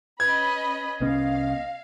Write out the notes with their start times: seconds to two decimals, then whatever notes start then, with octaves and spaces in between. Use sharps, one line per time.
0.20 C#4 B4 D#5 B5 G#6
1.00 C2 B3 C#4 D#5 F5